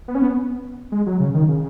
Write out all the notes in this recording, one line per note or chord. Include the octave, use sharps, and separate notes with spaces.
B3
C#4
B3
G#3
F#3
C#3
D#3
C#3